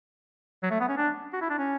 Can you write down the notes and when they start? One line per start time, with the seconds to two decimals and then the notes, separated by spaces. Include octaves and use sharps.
0.63 F#3
0.71 A3
0.80 B3
0.89 C#4
0.97 D4
1.33 F#4
1.41 E4
1.50 D4
1.59 C#4